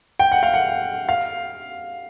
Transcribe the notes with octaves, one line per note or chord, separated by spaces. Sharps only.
G5
F#5
F5
F#5
F5